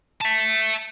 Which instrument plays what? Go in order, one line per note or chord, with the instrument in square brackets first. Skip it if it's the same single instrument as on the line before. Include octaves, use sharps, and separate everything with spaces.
[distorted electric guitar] E5 A5